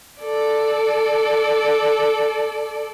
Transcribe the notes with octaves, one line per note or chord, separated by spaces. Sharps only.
A4 D5